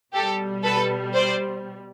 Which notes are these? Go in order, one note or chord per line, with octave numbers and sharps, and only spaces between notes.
B2 G3 G4 A4
A4 B4
C5 D5